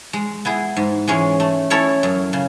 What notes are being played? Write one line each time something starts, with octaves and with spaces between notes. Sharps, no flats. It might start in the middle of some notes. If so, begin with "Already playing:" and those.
G#3
B3 E4 G#4
G#2
E3 G#3 C#4 G#4
A3
C#4 E4 A4 C#5
F#2
C#3